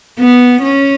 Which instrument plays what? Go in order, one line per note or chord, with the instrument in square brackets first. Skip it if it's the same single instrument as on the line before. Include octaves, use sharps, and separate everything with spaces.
[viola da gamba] B3
C#4